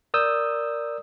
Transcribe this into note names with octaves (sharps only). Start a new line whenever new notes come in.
A#4 D5 D#6 E6 G6